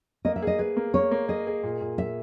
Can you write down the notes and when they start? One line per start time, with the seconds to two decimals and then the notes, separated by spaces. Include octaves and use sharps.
0.25 A#3 D#5
0.36 E5
0.42 G#4 D#5
0.59 G#4 B4
0.77 A#3
0.94 A#3 C#5
1.11 A#3
1.28 G#4 D#5
1.47 G#4
1.63 A#2
1.81 A#2
1.98 A#2 E5